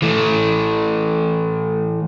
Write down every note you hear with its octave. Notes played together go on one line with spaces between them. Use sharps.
E3 A3